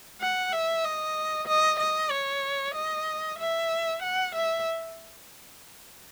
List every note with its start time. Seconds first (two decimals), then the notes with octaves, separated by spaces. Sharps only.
0.21 F#5
0.53 E5
0.84 D#5
1.47 D#5
1.79 D#5
2.11 C#5
2.75 D#5
3.39 E5
4.02 F#5
4.35 E5